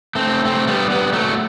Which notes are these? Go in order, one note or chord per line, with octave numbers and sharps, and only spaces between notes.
A3 C4
A3 C4
G3 B3
G3 B3
F#3 A3